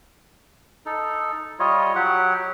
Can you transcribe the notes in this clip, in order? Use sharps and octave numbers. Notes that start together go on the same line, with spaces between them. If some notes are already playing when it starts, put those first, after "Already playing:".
D#4 A4
G3 F4 C#5 D#5
F#3 G4 F#5